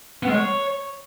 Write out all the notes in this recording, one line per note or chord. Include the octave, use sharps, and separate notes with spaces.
B3
G#3
C#5